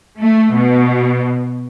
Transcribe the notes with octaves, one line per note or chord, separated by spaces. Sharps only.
A3
B2